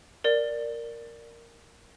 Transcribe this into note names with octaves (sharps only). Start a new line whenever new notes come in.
A#4 D5